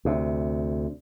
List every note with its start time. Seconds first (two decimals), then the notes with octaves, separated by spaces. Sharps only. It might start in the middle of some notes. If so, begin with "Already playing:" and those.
0.05 D2 C3